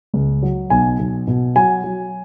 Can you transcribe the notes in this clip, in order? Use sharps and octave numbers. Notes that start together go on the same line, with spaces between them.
C#2
F#3
B1 G#5
B1
B2
F#3 G#5
F#3